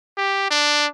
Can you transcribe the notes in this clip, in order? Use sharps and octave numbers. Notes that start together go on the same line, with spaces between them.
G4
D4